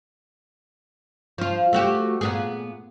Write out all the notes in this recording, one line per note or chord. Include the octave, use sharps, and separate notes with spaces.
F3 F4
A3 F#4 G4
A#2 B3 G#4